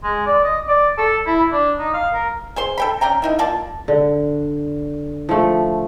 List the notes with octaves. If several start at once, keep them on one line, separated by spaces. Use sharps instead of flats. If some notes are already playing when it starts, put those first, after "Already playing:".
G#3
D5
D#5
D5
A4
E4
D4
D#4
F5
A#4
G#4 C5 C6
A4 G5 B5
C#4 D5 G5 A#5
D3 D#4 E4
A#3 F4 D5 A5
D3
F3 A3